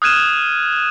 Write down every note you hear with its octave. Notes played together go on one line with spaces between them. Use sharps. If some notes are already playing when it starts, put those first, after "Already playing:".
D#6 F6 F#6 G#6 D#7 E7